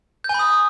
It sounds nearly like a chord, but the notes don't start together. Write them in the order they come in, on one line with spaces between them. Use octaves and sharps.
G6 G#5 B5 D#6